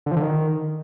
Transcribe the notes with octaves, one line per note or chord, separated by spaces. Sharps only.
D3
F3
D3
D#3